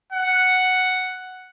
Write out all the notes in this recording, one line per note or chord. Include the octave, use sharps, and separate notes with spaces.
F#5